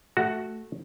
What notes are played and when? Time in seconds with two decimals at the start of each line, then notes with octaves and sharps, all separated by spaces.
0.17 A3 F#4